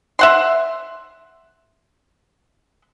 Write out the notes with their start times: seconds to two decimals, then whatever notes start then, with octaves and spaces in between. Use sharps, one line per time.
0.19 E5 F#5 C6